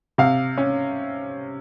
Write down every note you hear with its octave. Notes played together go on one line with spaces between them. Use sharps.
C3 F5
C#4